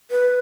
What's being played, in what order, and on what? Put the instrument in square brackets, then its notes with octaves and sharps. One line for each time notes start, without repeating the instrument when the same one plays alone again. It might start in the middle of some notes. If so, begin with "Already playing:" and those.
[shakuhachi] B4